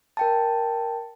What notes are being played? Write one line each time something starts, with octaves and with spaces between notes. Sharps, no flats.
A#4 G5 A5